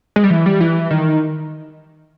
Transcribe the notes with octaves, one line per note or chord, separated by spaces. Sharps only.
G#3
G3
E3
G3
E3
D#3